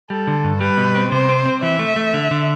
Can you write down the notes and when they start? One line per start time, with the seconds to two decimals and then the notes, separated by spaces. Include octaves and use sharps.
0.10 G3 A4
0.27 D3
0.44 G2
0.61 G3 B4
0.77 B2
0.95 C4
1.12 C3 C5
1.29 C4
1.46 C4
1.62 E3 E5
1.79 A3
1.96 A3
2.14 D3
2.31 D3